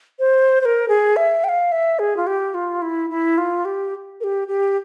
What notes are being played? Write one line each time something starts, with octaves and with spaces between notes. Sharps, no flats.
C5
C5
A#4
G#4
E5
G5
F5
E5
G#4
F4
G4
F4
E4
E4
F4
G4
A#4
G4
G4